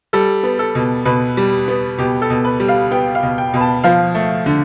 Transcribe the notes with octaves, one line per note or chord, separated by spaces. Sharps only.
G3 A4
B3
A4
B2
B2 B4
G3
B3
B2 G4
A4
B2
B4
G3
F5
B3 G5
F5
B2
G5
B2 B5
A5
F3 F5
A3
D3